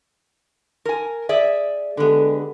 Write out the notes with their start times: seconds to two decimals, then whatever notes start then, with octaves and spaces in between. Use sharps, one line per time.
0.85 A#4 G#5
1.29 G#4 D5 E5
1.97 D3 G#3 B3 G4 A4